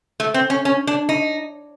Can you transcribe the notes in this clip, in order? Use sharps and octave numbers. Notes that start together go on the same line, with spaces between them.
A3
C4
C#4
C#4
D4
D#4